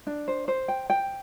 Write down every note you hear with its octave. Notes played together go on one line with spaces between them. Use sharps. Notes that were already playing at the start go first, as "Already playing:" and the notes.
D4
C5
C5
G5
G5